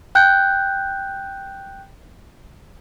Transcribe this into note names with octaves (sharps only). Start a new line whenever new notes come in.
G5 F#6 G6